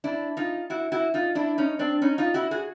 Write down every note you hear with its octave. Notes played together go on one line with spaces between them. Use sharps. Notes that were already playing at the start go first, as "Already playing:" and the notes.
D4 E4
D#4 F4
E4 F#4
E4 F#4
D#4 F4
D4 E4
C#4 D#4
C4 D4
C#4 D#4
D#4 F4
E4 F#4
F#4 G#4